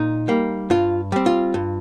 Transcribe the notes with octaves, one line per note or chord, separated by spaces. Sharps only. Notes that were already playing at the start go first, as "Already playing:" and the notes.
Already playing: A#2 D#4
G3 A#3
G2 F4
G3 C4
F4
G2